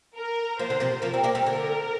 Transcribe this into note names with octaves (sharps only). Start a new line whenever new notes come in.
A#4
F3 A#3 C5
D3
C3 F3
F3 A#3 A#4
G3 C4
A#3 D4
G3 C4
D3 A#4